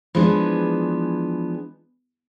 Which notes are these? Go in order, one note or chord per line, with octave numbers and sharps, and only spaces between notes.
E3 F3 G#3 B3 D4